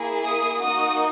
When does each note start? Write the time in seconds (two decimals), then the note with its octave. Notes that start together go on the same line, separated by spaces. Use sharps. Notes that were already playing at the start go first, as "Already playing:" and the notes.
Already playing: A#3 E4 G#4
0.26 D#6
0.60 A#3 D#4 F#4 D#6